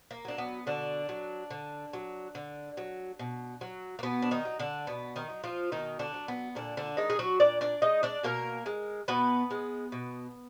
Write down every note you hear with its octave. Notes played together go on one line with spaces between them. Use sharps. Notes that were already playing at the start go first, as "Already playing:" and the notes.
A#3
F#3 D4
B3
B2 D3 D4
F#3
D3
F#3
D3
F#3
B2
F#3
A#3
B2 B3
D4
D#3 D#4
F#3
D3 D4
B2 B3
D#3 D#4
F#3
F3 F4
B2 D#3 D#4
D3 D4
F#3
B3
A#2 D3 D4
D3 D4
D#3 G#3 D#4
G#4
F#3 F#4
A#2 D4 D5
D4 D5
G#3 D#4 D#5
D4 D5
B2 A#3 A#4
G#3
B2 B3 B4
G#3
B2